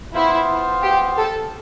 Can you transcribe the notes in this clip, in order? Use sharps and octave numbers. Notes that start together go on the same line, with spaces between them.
B3 E4 F4 C5 F5
G4
A4